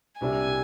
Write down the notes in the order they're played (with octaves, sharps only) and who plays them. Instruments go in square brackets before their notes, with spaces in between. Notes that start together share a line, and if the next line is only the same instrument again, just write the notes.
[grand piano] C2 C3 G3 D4 [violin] G#5